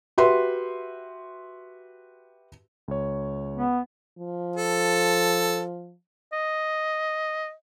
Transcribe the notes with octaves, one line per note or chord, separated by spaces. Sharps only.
F#4 G4 B4 E5 C6
C#2 C#5
B3
F3
A4
D#5